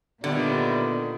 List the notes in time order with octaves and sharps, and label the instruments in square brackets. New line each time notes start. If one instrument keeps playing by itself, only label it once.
[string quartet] A#2 D#3 [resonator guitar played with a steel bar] D3 [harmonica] G3 E4 D5 [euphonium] B3